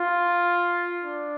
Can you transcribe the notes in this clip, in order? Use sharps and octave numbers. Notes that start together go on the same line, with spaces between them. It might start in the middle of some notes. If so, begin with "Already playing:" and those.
Already playing: F4
D4